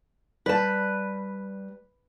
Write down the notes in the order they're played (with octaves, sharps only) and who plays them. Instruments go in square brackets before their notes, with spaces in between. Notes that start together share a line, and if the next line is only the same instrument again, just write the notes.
[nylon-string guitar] G3 A5 [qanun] B4